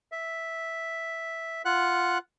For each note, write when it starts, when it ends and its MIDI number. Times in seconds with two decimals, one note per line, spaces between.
0.12 1.62 76
1.65 2.18 65
1.65 2.18 78
1.65 2.18 90